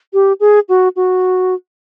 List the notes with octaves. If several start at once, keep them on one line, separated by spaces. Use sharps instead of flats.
G4
G#4
F#4
F#4